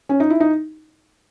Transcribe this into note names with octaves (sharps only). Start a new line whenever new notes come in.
C#4
D#4
E4
D#4